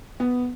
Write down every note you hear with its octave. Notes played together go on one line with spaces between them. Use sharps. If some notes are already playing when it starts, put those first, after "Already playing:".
B3